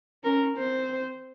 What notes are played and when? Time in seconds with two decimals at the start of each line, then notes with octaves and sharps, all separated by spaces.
0.24 C#4 A#4
0.57 C4 C5